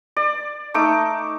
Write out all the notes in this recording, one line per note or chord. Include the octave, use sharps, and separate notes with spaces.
D5
A3 D#4 D6